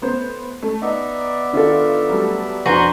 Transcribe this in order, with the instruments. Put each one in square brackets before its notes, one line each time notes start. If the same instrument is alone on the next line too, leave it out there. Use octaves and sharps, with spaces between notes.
[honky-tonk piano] A2 B3 C5
A3
[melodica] B3 D5 E5 [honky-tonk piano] D#4
[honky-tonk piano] D#3 F4 [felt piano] D4 A4
[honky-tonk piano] F#3 G3 A3
[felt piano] F2 D4 [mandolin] F#4 B4 C5 [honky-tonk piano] F#5 G#5 A#5